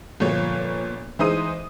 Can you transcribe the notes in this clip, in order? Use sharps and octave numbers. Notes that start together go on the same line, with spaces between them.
G1 A#2 F3 C#5
E3 G#3 D#4 C5 D#6 D#7